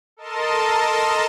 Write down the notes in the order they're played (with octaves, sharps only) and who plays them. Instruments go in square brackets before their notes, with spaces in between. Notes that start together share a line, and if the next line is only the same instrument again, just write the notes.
[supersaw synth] A4 A#4 D#5 A5 C6